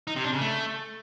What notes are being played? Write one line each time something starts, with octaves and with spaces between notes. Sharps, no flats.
D#4
C3
D4
C#3
A3